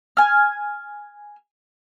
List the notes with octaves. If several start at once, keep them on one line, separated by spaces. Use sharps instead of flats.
G#5 F6